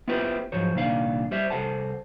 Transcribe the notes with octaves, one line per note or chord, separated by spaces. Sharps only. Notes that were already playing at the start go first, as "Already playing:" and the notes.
B3 E4 F4 G4 B4 C5
G#2 F3 F#3 C5 C#5
C2 A#2 D#3 D4 F5
G3 C5 E5
C2 F2 A4 C5 F#5 A5